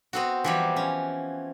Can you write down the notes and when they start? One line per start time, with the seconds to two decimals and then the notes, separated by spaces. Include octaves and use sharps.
0.13 B3 C4 F#4
0.44 E3 F3 G3
0.76 C#4